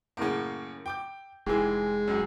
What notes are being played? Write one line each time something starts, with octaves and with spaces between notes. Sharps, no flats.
F#2 A2 C#3 A#3 C#4
G5 D6 G6
F1 G#2 E3 G#3 G4 G#4
C#2 F#2